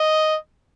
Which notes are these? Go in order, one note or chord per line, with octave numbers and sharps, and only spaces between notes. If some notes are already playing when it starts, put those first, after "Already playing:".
Already playing: D#5